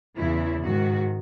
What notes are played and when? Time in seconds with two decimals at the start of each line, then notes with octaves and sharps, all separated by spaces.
0.16 E2 C#3 E3 E4
0.64 G#2 D#3 F#4